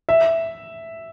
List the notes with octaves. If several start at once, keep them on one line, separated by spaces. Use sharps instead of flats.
E5